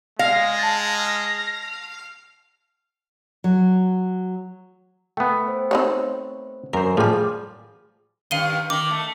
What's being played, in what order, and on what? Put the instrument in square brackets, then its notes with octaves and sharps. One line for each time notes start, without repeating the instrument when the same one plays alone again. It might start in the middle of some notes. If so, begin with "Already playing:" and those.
[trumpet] G#3 [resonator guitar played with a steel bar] F5 [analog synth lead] A#6
[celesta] A5 A6
[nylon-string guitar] F#3
[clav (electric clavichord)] A3 B3 [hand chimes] G5
[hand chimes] C5
[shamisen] C4 D#4 C#5
[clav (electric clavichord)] F#2 C5 [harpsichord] A#4
[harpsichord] A2 G#5 [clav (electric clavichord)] F3 G3 [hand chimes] G#4
[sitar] G2 D#3 [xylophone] F5 D#7 G7
[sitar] D#3 [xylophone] D6
[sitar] A3